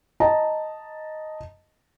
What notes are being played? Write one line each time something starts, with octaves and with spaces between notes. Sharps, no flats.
D#5 A5 A#5